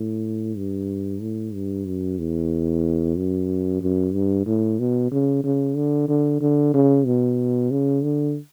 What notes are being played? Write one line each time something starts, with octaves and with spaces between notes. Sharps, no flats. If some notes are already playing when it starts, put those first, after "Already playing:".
Already playing: A2
G2
A2
G2
F#2
E2
F#2
F#2
G2
A2
B2
C#3
C#3
D3
D3
D3
C#3
B2
C#3
D3